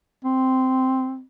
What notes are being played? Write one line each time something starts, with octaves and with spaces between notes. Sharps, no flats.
C4